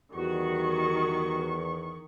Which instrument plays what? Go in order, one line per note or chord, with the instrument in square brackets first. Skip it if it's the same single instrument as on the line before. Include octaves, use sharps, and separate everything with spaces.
[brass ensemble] E2 [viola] D#3 C#6 [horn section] G3 F#4